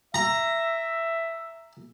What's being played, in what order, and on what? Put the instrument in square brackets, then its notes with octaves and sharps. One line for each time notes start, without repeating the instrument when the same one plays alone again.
[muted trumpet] E5 [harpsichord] A#5